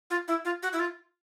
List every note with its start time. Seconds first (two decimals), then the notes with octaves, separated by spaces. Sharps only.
0.10 F4
0.28 E4
0.45 F4
0.63 F#4
0.73 E4
0.79 F4